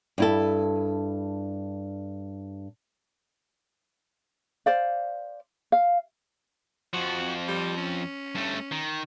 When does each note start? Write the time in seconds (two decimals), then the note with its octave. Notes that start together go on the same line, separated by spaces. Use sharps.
0.18 G2 E4 A4
4.66 C5 D5 F5
5.72 F5
6.93 F2 F3 F#4
7.48 G3
7.77 C#4
8.35 G2 A3
8.71 D#3